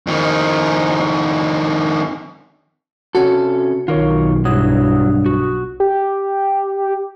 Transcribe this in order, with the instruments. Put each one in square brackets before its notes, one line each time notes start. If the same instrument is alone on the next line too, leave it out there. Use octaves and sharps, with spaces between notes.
[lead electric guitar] F2 D#3
[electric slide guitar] C3 C#4 A4 [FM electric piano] F#4
[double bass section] B1 [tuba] D#3 [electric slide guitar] F4 A#4 C#5
[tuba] G2 [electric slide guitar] F#3 E4 [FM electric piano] D#6
[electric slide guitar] F#4
[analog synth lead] G4